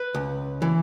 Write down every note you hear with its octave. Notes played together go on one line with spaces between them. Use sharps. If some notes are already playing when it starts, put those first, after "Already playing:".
Already playing: B4
C#2
E3